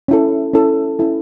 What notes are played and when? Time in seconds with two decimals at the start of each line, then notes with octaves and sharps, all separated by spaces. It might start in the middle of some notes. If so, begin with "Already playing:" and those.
0.08 C#4 E4 A4
0.54 C#4 E4 A4
0.99 C#4 E4 A4